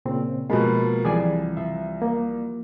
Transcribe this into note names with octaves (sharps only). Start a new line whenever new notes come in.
A#2 C#3 C4
B2 F3 G#3 A#3 A5 B5
C2 E3 F3 G3 G#4 D5 G#5
F3 E5
A#3